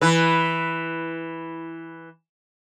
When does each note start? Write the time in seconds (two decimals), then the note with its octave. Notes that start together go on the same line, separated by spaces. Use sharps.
0.01 E3 B4